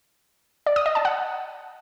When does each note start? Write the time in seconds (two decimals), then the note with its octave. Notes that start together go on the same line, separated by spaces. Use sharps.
0.66 D5
0.76 D#6
0.86 D#5
0.95 A5
1.05 F#5